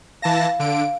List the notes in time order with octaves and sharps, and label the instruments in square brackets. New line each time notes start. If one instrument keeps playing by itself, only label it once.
[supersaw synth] E3 A5 A#6 [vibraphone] F5
[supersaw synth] D3 D7